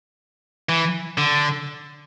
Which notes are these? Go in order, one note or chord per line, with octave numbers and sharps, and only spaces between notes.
E3
D3